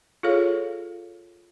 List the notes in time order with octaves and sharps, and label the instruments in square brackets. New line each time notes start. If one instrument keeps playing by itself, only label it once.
[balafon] F4 G#4 A4 C#5 F5